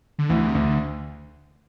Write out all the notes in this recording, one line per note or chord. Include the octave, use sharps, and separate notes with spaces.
D3
D2 E3
C3
D2 D3